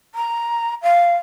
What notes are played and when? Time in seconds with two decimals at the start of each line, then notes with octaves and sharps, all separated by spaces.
0.14 A#5
0.82 F5